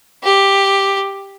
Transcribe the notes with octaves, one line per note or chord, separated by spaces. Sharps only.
G4